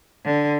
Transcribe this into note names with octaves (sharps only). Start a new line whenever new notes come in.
D3